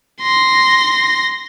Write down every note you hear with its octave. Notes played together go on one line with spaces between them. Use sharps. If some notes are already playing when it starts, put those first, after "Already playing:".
C6 A#6